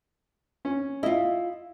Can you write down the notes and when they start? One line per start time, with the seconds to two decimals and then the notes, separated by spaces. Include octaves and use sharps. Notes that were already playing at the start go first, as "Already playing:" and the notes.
0.65 C#4
1.03 E4 F4 D#5